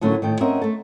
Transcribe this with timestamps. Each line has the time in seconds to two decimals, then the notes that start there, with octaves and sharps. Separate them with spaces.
0.01 A2 D3 F#3 A3 A#3 C#4
0.22 A2 D#3 G5
0.40 C4 C#4 A#4 D#5 E5 F#5
0.62 A3 A4